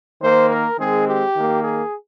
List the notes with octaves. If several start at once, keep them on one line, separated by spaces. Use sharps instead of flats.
D#3 A#3 C5
A#4
D#3 G#3 C4 G#4
G4
D#3 A#3
G#4